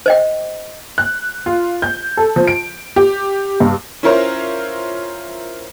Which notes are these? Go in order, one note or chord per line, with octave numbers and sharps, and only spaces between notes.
C5 D#5 G5
F#6
F4
G6
A4
F3
D7
G4
G2
C#4 E4 F4 A#4 C5 C#5